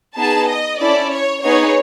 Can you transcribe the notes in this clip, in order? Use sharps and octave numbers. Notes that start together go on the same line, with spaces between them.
B3 D#4 G#4 A5
D#5
C#4 E4 A4 D5
C#5
B3 D#4 G#4 C#5